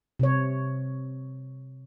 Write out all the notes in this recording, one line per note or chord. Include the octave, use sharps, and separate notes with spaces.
C3 C#5